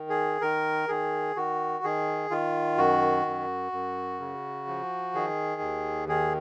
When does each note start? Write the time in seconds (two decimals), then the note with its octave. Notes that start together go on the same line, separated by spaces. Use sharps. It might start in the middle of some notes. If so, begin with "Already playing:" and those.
Already playing: D#3
0.10 G#4
0.41 D#3 A#4
0.88 D#3 G#4
1.36 D#3 F#4
1.84 D#3 G#4
2.30 D#3 F4
2.78 F#2 F#4
3.26 F#2
3.72 F#2
4.20 C#3
4.67 F3
5.14 D#3 G#4
5.61 D#2
6.09 D#3 G#4